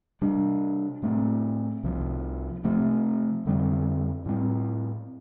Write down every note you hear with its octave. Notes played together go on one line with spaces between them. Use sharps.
C3 G3 D4
A2 A3 C4
C2 C3 F3
C3 F3 A3 C4
F2 D3 G3 C4
A2 G3 C4